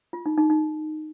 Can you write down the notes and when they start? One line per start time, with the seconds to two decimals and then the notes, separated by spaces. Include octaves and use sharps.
0.13 F4
0.26 D#4
0.38 D#4
0.50 D#4